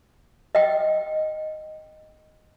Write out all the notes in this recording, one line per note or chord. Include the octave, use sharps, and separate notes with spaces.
D#5 G5